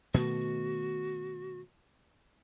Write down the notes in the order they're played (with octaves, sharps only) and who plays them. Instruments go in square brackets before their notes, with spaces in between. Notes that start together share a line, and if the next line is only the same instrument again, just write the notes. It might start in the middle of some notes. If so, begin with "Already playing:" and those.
[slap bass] B2 D#3 A3 [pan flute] F#4